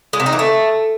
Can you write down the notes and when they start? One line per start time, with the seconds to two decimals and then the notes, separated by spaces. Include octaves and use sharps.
0.13 G#3
0.20 C3
0.26 D#4
0.33 E3
0.39 A3